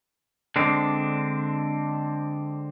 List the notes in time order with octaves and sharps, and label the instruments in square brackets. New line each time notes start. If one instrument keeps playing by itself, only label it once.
[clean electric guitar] D3 G#3 C4 D4